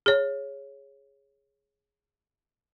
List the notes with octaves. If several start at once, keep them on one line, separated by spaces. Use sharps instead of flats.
G#4 C#5